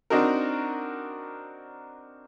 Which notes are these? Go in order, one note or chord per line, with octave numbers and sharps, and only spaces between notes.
C4 D4 D#4 F#4 A#4